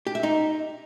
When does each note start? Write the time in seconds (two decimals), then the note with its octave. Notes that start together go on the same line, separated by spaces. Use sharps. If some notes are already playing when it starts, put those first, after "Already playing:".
0.07 G4
0.15 E5
0.23 D#4